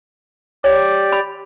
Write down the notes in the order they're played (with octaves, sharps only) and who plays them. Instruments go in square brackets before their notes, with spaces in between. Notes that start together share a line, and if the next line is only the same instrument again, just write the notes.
[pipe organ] G4 D5 [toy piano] C#5
[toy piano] B5